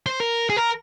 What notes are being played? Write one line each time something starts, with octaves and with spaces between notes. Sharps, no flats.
C5
A#4
G#4
A#4